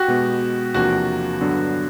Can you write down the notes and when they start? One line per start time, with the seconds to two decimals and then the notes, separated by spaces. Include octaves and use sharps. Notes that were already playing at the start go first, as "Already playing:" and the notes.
Already playing: F#4 G4
0.08 B2 G#3 B3
0.74 E2 C3 F3 A#3 D4 F#4
1.41 G2 D3 F#3 B3 D4